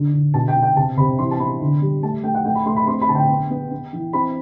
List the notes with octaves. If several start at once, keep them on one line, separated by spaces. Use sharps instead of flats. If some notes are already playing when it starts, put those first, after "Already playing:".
Already playing: D3
D3
B2 A5
G5
B2
G5
C3 A5
C3 B5
E3 C6
A5
B3 B5
D3
G3
A3 A5
A3 G5
F#5
A3 G5
B5
A3 C6
B5
C4 C6
B5
D3 A5
G5
B3
B3
B3
E3
C4 B5